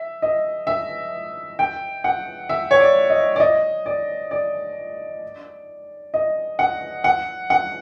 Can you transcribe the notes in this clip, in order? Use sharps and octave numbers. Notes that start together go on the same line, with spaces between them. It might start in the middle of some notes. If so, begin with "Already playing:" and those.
Already playing: E5
D#5
E5
G5
F#5
E5
C#5
D5
D#5
D5
D#5
D5
D5
D#5
F#5
F#5
F#5